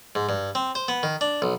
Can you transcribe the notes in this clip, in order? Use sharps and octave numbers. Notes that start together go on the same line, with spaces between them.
G#2
G2
C4
C5
B3
D#3
D4
B1